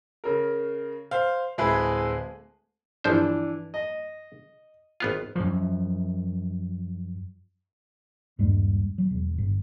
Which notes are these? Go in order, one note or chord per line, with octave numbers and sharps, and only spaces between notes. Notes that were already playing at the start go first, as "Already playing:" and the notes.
C#3 A#4
C5 F5
D1 G#3 E4 G#4 B4
G1 E3 F3 D4 C5
D#5
G#1 B3 F4
F#2 F3
D#1 G2 G3 G#3
F#3
E1
G1